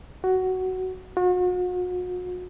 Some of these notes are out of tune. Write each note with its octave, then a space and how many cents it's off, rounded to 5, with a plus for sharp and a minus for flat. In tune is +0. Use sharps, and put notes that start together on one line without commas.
F#4 +10
F#4 -40